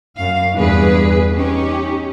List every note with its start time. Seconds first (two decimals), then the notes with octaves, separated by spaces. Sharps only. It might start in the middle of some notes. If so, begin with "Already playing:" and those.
0.16 F#2 F5
0.54 E2 G2 G#4 B4
1.35 C#4 D#4 G4